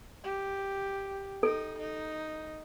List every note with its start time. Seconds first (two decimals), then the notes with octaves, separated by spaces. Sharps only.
0.24 G4
1.43 D#4 A4
1.79 D#4